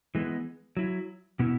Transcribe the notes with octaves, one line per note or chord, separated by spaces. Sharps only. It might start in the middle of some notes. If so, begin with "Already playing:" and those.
E3 G#3 B3
F#3 E4
B2 B3 E4